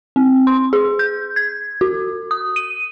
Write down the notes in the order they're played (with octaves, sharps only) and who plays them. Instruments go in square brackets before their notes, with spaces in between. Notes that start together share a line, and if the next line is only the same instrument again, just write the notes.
[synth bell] C4
C6
G#4
G6
G#6
F#4
D#6
D#7